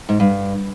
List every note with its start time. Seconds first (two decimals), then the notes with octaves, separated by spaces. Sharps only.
0.09 G#2
0.20 G2